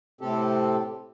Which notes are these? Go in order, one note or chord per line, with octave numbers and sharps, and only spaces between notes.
A2 C3 C4 G4 A4